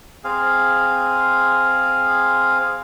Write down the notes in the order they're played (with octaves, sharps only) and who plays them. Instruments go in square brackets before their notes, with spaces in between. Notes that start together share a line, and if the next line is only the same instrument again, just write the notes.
[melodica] C4 G#4 F5